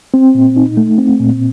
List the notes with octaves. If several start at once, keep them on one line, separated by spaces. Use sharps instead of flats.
C4
A#2
D#4
A3
C4
A#2